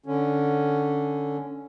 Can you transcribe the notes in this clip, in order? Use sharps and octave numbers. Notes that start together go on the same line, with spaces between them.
D3 C#4